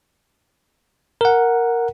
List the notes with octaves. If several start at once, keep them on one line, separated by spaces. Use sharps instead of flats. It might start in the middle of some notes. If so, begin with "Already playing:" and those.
A#4 F#5